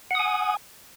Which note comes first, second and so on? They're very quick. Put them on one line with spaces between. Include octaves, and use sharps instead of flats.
F#5 D#6 G#5